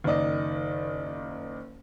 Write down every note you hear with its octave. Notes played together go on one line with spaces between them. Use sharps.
F#1 D#3 D5 D#5